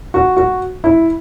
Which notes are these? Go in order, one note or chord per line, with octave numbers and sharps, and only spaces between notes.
F#4
F#4
E4